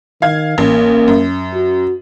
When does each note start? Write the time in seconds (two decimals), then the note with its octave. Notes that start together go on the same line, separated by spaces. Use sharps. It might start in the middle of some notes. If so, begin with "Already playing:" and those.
0.22 D#3 F5 G#6
0.58 A1 A#3
1.08 F#2
1.54 F#4